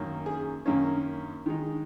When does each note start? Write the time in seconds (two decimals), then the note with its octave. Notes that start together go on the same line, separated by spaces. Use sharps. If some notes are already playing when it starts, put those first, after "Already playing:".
Already playing: F#2 D#3 A#3 C#4
0.26 G#4
0.66 F#2 D#3 A#3 C#4
1.46 D#3 G#3 D#4